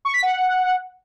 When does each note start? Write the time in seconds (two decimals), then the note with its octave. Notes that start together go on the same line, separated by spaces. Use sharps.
0.05 C#6
0.14 B6
0.23 F#5